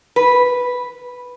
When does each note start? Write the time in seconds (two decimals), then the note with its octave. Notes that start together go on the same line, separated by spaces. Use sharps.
0.16 B4